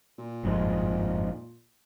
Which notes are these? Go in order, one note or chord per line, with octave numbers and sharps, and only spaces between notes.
A#2
G1 F2 G#2